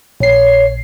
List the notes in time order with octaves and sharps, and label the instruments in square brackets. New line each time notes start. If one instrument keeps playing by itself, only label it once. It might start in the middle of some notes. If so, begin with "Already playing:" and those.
[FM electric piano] A#1 C7 [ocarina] C#5